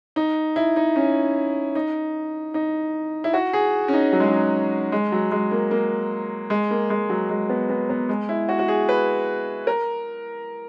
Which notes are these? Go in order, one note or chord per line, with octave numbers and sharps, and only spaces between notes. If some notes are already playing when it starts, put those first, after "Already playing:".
D#4
E4
D#4
C#4
D#4
D#4
E4
F#4
G#4
C#4
D#4
F#3
G#3
F#3
G#3
F#3
G#3
A#3
A#3
G#3
A#3
G#3
F#3
G#3
B3
B3
B3
G#3
E4
F#4
F#4
G#4
B4
A#4